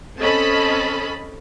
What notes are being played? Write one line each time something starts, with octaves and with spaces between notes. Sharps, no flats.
C4 C#4 A4 D#5 A5 B5